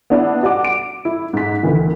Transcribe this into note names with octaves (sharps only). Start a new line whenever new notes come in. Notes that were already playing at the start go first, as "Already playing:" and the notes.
B3 D4 E4
F#4 D5 F#5 D6
D7
E4
G#2 B6
D2 D#3 E3